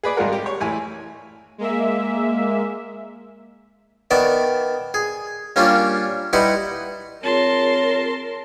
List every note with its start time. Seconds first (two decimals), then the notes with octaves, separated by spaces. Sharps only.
0.03 G#4 B4 D5
0.16 G#1 G3 G#3 F4 A#4 F#5
0.32 G4
0.46 C#5
0.60 A1 E4 G#5
1.58 G#3 A#3 E5
4.11 D#3 B3 D5 E5
4.94 G#4
5.56 G3 A#3 C#4 D4 F4
6.33 G3 D#4 E4 B4 F#5 C6
7.23 C4 F4 G#4 A#4 C#5 A5 C6